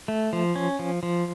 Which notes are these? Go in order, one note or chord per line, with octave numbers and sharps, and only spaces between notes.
A3
F3
C#4
F3
F3